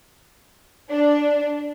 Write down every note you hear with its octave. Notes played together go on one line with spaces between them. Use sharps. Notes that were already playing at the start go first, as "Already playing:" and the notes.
D4